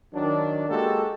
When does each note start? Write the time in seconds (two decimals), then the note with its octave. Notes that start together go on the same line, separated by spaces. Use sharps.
0.14 D#3 F#3 D4
0.68 G#3 A#3 F#4 G4 A4